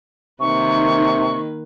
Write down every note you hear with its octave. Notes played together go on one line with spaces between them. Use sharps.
C3 D#3 A#3 B4 C#6